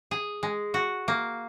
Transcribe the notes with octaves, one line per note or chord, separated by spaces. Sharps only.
G#4
G#3
F#4
A#3